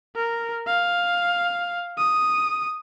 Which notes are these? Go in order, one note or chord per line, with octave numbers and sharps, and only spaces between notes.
A#4
F5
D#6